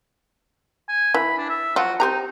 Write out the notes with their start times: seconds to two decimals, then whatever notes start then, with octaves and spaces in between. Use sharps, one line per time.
0.89 G#5
1.14 E3 B5
1.38 D4
1.49 E5
1.76 F3 F#3 F4 F#4
2.00 C4 D#4 G4 A#5